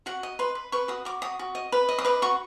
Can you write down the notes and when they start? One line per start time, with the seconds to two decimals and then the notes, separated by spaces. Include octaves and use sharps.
0.06 F#4 F#5
0.23 D#5
0.39 B4 C6
0.55 B4
0.72 B4 C#6
0.88 F#4 D#6
1.05 F#4 D6
1.22 F#4 D#6
1.39 F#4
1.55 D#5
1.72 B4
1.89 D#5
1.99 D#6
2.05 B4 D6
2.22 F#4 C#6